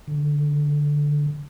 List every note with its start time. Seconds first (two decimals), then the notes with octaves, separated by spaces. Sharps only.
0.08 D3